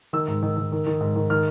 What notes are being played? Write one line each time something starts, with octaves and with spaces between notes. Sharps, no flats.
D#3 E6
G#2
D#3
D#3
D#3
D#3
G#2
D#3
D#3 F6